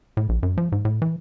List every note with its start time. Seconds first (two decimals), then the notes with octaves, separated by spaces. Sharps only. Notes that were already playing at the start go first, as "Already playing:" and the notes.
0.17 A2
0.29 A#1
0.43 F#2
0.58 F3
0.72 G#2
0.85 A2
1.02 E3